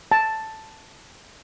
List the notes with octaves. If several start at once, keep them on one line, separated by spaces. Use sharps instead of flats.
A5